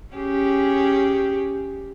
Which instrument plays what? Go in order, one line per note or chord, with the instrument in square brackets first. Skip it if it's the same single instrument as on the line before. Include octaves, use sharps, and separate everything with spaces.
[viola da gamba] C#4 G4 G#4